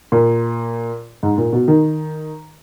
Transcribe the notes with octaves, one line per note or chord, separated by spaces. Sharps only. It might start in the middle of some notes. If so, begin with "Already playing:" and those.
A#2
G#2
A#2
B2
D#3